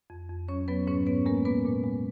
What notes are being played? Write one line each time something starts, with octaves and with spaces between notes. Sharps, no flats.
F2
F2
F#3 C#4 C#5
F#3 B3 B4
G#2 C#4 C#5
G#2 B3 B4
G#3 A#3 A#4
A#2 B3 B4
A#2
G#3